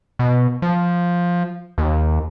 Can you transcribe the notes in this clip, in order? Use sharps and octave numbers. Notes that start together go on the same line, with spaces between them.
B2
F3
D#2